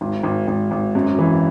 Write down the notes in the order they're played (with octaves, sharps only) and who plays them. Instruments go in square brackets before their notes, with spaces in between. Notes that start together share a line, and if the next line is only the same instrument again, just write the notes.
[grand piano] G#1
G#1
G#1
G#1
F#2
E3